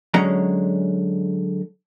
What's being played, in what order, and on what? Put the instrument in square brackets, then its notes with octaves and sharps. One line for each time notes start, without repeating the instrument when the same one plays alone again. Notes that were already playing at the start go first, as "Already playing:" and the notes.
[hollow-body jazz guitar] D3 F#3 G#3 C#4 F#5 A#5